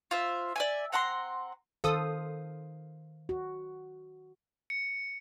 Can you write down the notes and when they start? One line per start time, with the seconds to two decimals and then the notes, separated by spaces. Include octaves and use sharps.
0.11 F4 C5 E5
0.56 D5 E5 G#5
0.92 C4 F#5 A#5 C6
1.84 D#3 A4 C5 F5 D#6
3.29 F#4
4.70 C#7